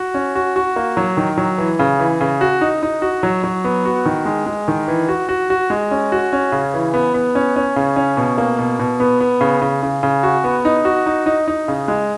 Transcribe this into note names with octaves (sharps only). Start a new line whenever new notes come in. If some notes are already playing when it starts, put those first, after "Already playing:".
Already playing: F#4
C#4
F#4
F#4
A#3
F#3
D#3
F#3
E3
C#3
E3
C#3
F#4
D#4
D#4
F#4
F#3
F#3
B3
F#4
D#3
G#3
G#3
D#3
E3
F#4
F#4
F#4
G#3
C#4
F#4
C#4
C#3
E3
B3
B3
C#4
C#4
C#3
C#4
B2
A#3
B2
B2
B3
B3
C#3
C#3
C#3
C#3
F#4
B3
D#4
F#4
D#4
D#4
D#4
C#3
G#3